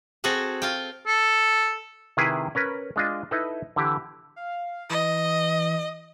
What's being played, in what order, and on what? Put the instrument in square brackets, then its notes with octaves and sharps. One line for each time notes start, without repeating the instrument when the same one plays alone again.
[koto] C4 F#4 G#4 A4 F#5
F4 F5 G5
[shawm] A4
[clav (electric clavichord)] C3 D#3 E4 G#4 B4
C#4 A#4 B4
G#3 D4 F4 D#5
D#4 E4 A4 B4 D#5
D3 E3 G4
[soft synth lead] F5
[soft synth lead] E3 [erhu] D#5